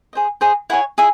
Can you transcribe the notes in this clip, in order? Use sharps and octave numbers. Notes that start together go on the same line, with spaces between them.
G#4 C5 D#5
G#4 C5 D#5
E4 G#4 C#5 F#5
E4 G#4 E5